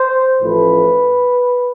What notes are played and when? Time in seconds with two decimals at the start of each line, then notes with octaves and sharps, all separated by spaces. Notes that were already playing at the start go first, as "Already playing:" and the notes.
Already playing: C5
0.41 A1 A2 F3 A3 B4